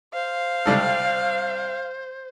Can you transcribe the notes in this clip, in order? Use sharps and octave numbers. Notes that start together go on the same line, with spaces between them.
C5 F5
C2 G3 A4